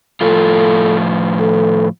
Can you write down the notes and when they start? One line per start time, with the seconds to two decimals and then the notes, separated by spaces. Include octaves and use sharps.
0.21 A2 F3 F4 A4
1.39 A4